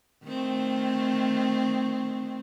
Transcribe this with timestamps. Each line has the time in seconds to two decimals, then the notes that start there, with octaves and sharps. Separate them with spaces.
0.24 D#3 A3 C4